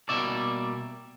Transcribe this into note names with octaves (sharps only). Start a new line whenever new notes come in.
B2 G3 A#3 D5 E5